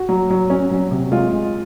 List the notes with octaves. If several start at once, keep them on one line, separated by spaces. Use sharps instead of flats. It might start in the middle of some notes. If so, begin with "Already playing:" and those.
Already playing: F#4
F#3
F#3
C#4
F#3
C3
G#3 F4
G#3